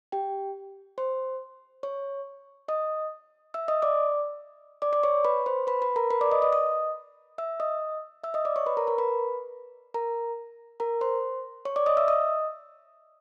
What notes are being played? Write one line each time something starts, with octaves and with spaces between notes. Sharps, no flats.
G4 G5
C5 C6
C#5 C#6
D#5 D#6
E5 E6
D#5 D#6
D5 D6
D5 D6
D5 D6
C#5 C#6
B4 B5
C5 C6
B4 B5
B4 B5
A#4 A#5
B4 B5
D5 D6
D#5 D#6
D#5 D#6
D#5 D#6
E5 E6
D#5 D#6
E5 E6
D#5 D#6
D5 D6
C#5 C#6
B4 B5
A#4 A#5
A#4 A#5
B4 B5
A#4 A#5
A#4 A#5
C5 C6
C#5 C#6
D5 D6
D#5 D#6
E5 E6
D#5 D#6